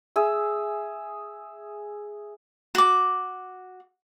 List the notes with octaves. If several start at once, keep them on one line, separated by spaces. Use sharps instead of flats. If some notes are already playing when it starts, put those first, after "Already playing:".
G#4 E5
F#4 D6